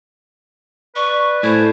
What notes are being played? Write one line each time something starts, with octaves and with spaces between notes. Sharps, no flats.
B4 D5 C#6
A2 C5 G#5